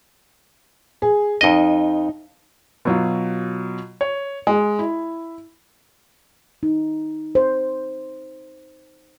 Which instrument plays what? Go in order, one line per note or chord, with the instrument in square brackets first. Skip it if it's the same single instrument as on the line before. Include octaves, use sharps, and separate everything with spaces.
[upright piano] G#4
[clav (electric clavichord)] F2 D#5 [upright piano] D#4 G7
[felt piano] B2 F#3 F4
C#5
G#3
E4
[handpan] D#4
C5